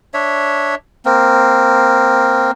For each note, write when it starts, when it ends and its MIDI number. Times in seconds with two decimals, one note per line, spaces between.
0.14 0.75 62
0.14 0.75 73
0.14 0.75 76
1.05 2.51 58
1.05 2.51 60